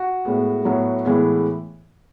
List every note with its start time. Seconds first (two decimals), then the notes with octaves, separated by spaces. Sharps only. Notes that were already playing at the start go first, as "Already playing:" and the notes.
Already playing: F#4
0.25 A2 G#3 B3
0.65 A2 F#3 B3
1.05 A2 E3 G#3 B3